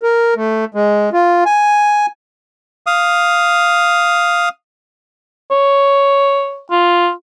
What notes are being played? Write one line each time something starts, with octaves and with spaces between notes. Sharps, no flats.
A#4
A3
G#3
F4
G#5
F5 D#6
C#5
F4